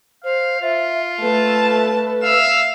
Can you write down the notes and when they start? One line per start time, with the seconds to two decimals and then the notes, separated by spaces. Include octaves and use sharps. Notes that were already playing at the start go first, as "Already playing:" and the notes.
0.24 C5 F5
0.62 F4 E5
1.21 A3 A4 B4 A5
2.23 E5 F5 E6